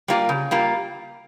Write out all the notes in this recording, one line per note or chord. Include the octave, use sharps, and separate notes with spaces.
G3 A#3 F4
C#3
G3 A#3 F4